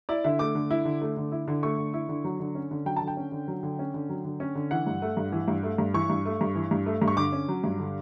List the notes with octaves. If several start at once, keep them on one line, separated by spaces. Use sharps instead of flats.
E4 D5
D3 E5
A3 D6
D3
E4
D3
A3
D3
E4
D3
A3 C#6
D3
E4
D3
F#3
D3
C#4
D3
F#3 G5
D3 A5
G5
C#4
D3
F#3
D3
C#4
D3
F#3
D3
C#4
D3
E3 F#5
G2
A3
G2
E3
G2
A3
G2
E3 C#6
G2
A3
G2
E3
G2
A3
G2
C#6
D3 D6
C#4
F#3
G2
D3